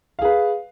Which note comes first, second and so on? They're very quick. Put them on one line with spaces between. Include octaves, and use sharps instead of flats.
F5 G#4 B4